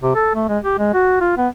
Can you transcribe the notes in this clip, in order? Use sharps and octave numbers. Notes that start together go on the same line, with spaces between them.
C3
A4
A3
G#3
G4
G#3
F#4
F4
B3